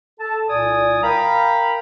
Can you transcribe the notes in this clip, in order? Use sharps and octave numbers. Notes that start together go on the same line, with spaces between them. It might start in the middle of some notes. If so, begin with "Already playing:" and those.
A4 A5
C2 A#2 D5 G#5 D#6
E4 A#4 F5 G5 A#5 B5